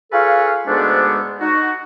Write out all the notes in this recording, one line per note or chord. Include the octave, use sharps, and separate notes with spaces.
F4 G#4 A4 B4 C#5 F5
D2 G#2 G#3 A3 B3 D4
D#4 F#4